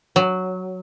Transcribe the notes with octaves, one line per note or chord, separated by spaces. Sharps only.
F#3